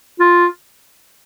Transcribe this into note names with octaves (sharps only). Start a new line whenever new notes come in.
F4